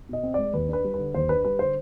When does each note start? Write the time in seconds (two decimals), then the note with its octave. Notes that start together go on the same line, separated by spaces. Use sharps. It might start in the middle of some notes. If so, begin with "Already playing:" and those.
0.09 B2 D#5
0.23 C4
0.34 G#3 D5
0.53 D#2 B4
0.68 D4 B4
0.84 G3
0.94 D3 B4
1.14 D#2 C5
1.29 D4 B4
1.45 G3 B4
1.59 D3 C5